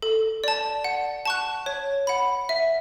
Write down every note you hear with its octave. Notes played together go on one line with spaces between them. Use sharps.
A4
D5 A5
F#5
A5 C#6 F#6
C#5
F#5 B5
E5